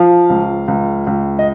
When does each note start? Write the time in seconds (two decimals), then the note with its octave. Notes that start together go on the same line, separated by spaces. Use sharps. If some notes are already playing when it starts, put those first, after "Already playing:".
Already playing: F3 F5
0.30 C#2
0.68 C#2
1.07 C#2
1.39 D#5